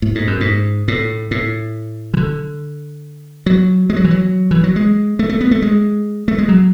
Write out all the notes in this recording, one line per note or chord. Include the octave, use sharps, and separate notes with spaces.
A2
G#2
F#2
G#2
A2
A2
E3
D3
F#3
G#3
F#3
E3
F#3
E3
F#3
G#3
A3
A3
B3
A3
G#3
A3
G#3
F#3